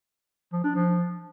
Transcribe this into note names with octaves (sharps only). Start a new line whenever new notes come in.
F3
D4
F3